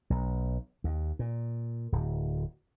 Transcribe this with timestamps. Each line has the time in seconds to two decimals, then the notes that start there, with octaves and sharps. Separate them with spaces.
0.10 B1
0.84 D#2
1.19 A#2
1.92 D1